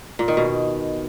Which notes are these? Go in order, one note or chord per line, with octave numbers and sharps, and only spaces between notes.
A#2
D#3
B2